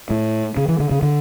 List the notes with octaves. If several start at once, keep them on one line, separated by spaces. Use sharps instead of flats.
A2
C#3
E3
D3
C#3
D3